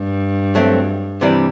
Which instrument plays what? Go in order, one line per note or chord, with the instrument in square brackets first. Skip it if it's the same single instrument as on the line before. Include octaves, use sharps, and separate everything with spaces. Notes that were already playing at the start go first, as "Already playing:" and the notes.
Already playing: [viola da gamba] G2
[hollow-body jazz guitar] F#3 A3 C4
C3 E3 G3 D4